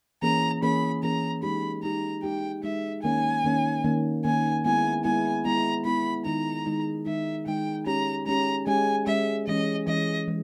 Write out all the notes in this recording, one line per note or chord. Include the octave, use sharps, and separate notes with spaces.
E3 A#3 C#4 G#4 A#5
E3 A#3 C#4 G#4 B5
E3 A#3 C#4 G#4 A#5
G#3 D#4 G4 B5
G#3 D#4 G4 A#5
G#3 D#4 G4 G5
G#3 D#4 G4 E5
D#3 A#3 C#4 G#5
D#3 A#3 C#4
D#3 A#3 C#4
D#3 A#3 C#4 G#5
G#3 B3 E4 G#5
G#3 B3 E4 G#5
G#3 B3 E4 A#5
G#3 B3 E4 B5
D#3 G#3 D#4 A#5
D#3 G#3 D#4
D#3 G#3 D#4 E5
D#3 G#3 D#4 G5
G#3 C#4 G4 A#5
G#3 C#4 G4 A#5
G#3 C#4 G4 G#5
G#3 C#4 G4 E5
E3 G#3 C#4 D#5
E3 G#3 C#4 D#5
E3 G#3